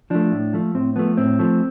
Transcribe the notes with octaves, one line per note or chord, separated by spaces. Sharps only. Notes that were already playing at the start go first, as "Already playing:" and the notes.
F3 A3 D4
A2
F3 A3
A2 C4
F3 A3 B3
A2 C4
F3 A3